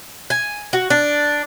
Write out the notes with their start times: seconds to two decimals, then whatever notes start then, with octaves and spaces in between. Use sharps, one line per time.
0.30 G#5
0.73 F#4
0.90 D4